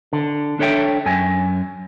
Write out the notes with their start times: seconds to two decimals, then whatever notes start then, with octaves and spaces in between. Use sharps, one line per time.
0.13 D3
0.59 D4 A4 C#5 E5 G5
1.06 F#2 F#3 G#5